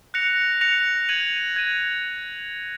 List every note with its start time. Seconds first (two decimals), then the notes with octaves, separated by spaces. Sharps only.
0.14 F#6 A#6 C#7 F7
0.61 F#6 A#6 C#7 F7
1.09 G#6 D#7 F#7
1.56 G#6 D#7 F#7